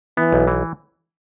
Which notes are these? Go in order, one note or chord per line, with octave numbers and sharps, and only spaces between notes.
E3 B3
B1
E3